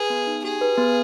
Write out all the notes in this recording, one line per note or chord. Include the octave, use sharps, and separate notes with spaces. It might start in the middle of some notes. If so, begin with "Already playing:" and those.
Already playing: G#4 B4
B3
D#4
G4 G#4
B4
B3